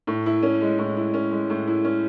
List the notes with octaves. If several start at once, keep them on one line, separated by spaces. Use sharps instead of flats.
A2
E4
C#4
G#3
A2
E4
C#4
G#3
A2
E4
C#4